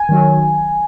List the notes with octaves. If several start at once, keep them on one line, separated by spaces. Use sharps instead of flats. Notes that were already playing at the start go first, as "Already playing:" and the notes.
Already playing: G#5
D#3 F#3